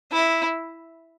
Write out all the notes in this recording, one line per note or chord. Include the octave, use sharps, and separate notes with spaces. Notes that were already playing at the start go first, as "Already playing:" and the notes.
E4